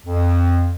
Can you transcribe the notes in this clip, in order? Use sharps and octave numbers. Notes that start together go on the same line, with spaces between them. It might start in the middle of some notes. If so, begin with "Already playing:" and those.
F2